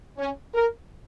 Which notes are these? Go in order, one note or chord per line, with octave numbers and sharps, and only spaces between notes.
C#4
A#4